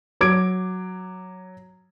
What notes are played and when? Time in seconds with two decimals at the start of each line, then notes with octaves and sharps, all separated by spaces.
0.21 F#3 D6 G#6 D7